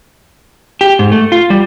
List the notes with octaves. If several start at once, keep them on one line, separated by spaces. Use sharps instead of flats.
G4
G#2
A3
F4
G3